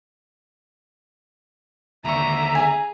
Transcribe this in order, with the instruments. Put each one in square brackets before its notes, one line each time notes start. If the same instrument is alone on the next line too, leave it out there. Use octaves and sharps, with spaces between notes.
[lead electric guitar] D#2 D3 [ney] E5 [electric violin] A#5 [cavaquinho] B5 C#6
[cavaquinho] G#4 G#5